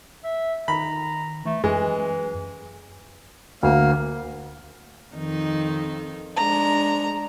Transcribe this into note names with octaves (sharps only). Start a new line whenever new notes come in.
E5
D#3 A#5 B5
E3 A3
F#2 E3 G#3
D2 A#3
F2 D#3 D#4
G#3 D4 A#5